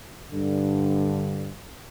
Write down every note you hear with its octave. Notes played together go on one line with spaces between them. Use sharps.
G2 D3